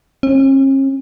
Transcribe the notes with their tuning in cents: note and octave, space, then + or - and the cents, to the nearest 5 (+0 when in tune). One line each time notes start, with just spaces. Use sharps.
C#4 -45